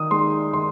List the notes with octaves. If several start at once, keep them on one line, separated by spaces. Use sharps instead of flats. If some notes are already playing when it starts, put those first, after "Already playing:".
Already playing: D#3 D#6
G#3 D#4 C6
D#3 C6